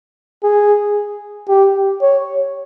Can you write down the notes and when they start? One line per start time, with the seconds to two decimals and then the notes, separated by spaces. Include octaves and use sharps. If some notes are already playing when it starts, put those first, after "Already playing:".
0.44 G#4
1.49 G4
2.02 C#5